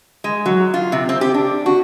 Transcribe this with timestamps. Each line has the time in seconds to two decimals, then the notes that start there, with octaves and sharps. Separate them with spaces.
0.24 G#3
0.46 F#3
0.74 F4
0.92 C3
1.09 C4
1.21 G4
1.34 D4
1.66 F#4